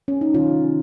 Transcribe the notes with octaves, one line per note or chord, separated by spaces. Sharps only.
C#4
D#4
C3 D#3 F#3 C#4 F4